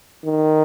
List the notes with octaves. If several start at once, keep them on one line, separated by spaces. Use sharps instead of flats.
D#3